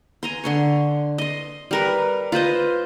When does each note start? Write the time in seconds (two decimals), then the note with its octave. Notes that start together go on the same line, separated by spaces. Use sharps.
0.23 G#5 A#5 C6
0.44 D3 C6 C#6
1.18 D#5 C6
1.71 G3 A#4 B4
2.32 F4 B4 C5 D#5